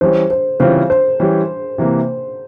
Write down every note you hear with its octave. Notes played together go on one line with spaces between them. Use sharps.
E3 G3 C#4 C5
C5
C#3 E3 G3 C4 F4 C5
C5
E3 G3 C#4 G4
C3 E3 A#3